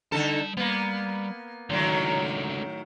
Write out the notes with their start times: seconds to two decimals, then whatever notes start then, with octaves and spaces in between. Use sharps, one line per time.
0.12 D3 G3 D#4 A4 A5
0.57 G3 A#3 B3
1.70 C#2 A2 D3 D#3 F#3